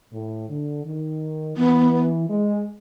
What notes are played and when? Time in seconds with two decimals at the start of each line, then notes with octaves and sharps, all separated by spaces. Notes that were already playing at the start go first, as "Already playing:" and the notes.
0.13 A2
0.49 D3
0.84 D#3
1.57 E3 B3
2.29 G#3